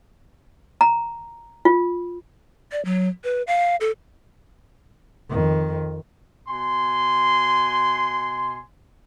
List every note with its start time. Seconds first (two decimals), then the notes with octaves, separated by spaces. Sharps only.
0.81 A#5
1.65 F4
2.72 D5
2.85 F#3
3.24 B4
3.47 F5
3.81 A4
5.30 F2 D#3
6.48 B2 G#5 C6